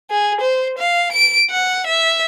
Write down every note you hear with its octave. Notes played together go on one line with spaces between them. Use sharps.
G#4
C5
F5
D7
F#5
E5